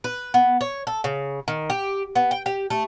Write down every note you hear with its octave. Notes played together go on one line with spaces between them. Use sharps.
B4
B3
C#5
A4
C#3
D#3
G4
B3
G5
G4
A3